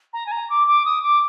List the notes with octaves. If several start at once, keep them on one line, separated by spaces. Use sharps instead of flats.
A#5
G#5
A#5
D6
D6
D#6
D6